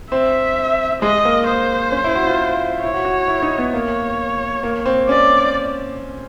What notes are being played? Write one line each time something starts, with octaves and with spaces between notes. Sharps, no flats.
C4 E5
G#3 D#5
A#3
C5
C#4
E4
F#4
F4
E4 C#5
F#4
F#4
E4
D#4
B3
A#3 C#5
A#3
C4
C#4 D5